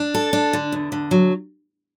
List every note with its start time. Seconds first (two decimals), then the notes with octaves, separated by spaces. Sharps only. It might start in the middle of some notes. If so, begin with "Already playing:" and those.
Already playing: D4
0.15 A4
0.33 D4
0.53 D3
0.72 E2
0.92 D3
1.11 F#3